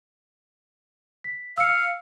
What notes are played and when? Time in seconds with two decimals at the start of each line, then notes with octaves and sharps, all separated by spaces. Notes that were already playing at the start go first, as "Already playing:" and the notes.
1.24 B6
1.58 F5 E6 C#7